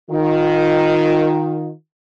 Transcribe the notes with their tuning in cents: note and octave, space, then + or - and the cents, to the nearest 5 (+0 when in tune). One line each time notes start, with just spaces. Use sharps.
D#3 +0 F4 +30